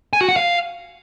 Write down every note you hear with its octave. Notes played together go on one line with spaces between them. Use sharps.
G#5
F#4
F#5
F5